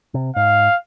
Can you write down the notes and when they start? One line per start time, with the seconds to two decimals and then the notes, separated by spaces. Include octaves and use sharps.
0.14 C3
0.36 G#2 F5